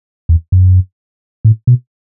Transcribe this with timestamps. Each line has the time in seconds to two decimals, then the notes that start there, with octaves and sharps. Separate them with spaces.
0.29 E2
0.52 F#2
1.45 A2
1.67 B2